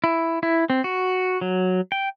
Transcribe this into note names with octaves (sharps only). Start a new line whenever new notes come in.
E4
E4
C4
F#4
F#3
G5